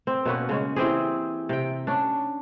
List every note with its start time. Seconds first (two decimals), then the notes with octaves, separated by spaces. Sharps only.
0.07 C4
0.25 B2 A#3 C#4 B4
0.49 C#3 G#3 C#4
0.76 E3 C4 G4 G#4
1.49 C3 G5
1.87 C#4 D4